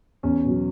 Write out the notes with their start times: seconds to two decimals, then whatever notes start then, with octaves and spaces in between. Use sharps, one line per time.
0.23 E2 C#4
0.45 B2 F#3